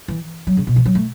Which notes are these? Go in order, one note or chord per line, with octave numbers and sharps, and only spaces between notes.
E3
F#3
C#3
B2
E3
F#3
A3